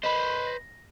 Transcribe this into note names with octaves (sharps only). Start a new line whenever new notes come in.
B4 C5 D#5 B5
A#6